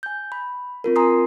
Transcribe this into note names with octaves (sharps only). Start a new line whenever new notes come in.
G#5 G6
B5
C4 F4 A#4
G#5 A#5 C6 D#6 C7